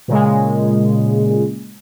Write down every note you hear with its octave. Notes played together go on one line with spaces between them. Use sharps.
A#2 C#3 G#3